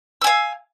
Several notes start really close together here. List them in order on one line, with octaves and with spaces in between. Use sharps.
E6 G#5 F5